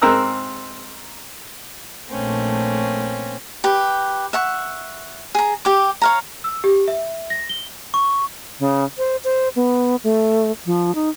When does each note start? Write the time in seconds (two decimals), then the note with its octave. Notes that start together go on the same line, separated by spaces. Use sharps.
0.02 G#2 C4 A#4 A#5 E6 F#6
2.09 A#1 A3 A#3 C4 C#4
3.64 G4 B4
4.33 E5 F#5 C#6
5.35 G#4 A#5
5.65 G4 D6
6.01 C#5 F5 A#5
6.44 E6
6.64 G4
6.88 E5
7.30 A#6
7.49 G7
7.94 C#6
8.59 C#3
8.98 C5
9.24 C5
9.56 B3
10.04 A3
10.66 F3
10.95 D#4